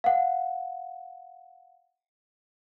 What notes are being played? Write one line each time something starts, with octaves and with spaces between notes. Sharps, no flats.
F5 F#5